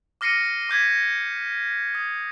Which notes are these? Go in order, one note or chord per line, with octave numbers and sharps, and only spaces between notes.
D6 F6 A#6 C7 C#7 D#7
D6 G6 G#6 B6
D#6